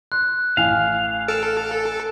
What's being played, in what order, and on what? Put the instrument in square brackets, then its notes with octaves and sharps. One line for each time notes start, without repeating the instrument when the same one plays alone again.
[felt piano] C6 [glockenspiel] F#6
[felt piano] A1 G#5 [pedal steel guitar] F5
[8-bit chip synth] A4 [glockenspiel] D7 E7